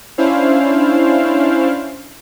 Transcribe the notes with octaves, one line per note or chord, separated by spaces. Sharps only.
C#4 D4 E4 C5 F5